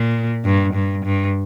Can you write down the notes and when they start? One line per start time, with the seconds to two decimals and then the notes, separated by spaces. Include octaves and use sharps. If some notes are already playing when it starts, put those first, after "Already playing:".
Already playing: A#2
0.45 G2
0.74 G2
1.05 G2